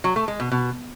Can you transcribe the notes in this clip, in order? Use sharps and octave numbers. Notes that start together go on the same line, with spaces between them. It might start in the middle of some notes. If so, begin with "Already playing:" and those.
F#3
A3
G#3
B2
B2